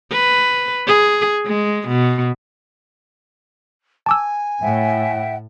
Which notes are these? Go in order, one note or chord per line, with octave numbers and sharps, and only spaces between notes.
B4
G#4
G#3
B2
G#5 A5 D6 E6
A2 E5 F#5 G5